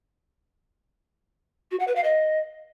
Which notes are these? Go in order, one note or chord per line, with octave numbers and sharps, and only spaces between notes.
F#4
F#5
B4
F5
D#5